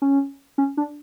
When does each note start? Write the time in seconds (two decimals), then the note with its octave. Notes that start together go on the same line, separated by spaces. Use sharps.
0.02 C#4
0.58 C#4
0.77 D4